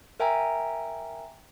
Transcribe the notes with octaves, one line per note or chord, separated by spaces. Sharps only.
A#4 E5 G5 G#5 A#5